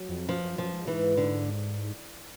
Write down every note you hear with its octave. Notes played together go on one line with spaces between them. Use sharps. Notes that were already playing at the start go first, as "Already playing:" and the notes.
Already playing: F#3
F2
F#2 F3
F#2
F#2 F3
G#2
E3
D3